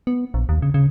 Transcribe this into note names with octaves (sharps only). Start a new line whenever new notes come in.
B3
A#1
D#2
C#3
C#3